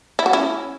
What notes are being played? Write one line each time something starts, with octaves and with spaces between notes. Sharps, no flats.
E4
F#4
C#4 E4